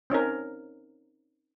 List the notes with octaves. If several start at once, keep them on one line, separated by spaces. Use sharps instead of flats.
C4 C#4 D#4 A#4